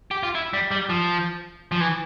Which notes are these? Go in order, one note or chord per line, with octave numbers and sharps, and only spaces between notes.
G4
F4
E4
G3
G3
F3
F3
E3